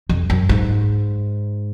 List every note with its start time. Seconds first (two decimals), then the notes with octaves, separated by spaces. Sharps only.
0.09 F2
0.30 F#2
0.49 G#2